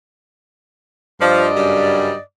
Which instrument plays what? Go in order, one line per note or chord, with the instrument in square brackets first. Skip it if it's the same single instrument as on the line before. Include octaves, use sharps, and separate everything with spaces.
[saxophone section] G2 D5 D#5 [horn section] F3
[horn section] F#2 C#3 G3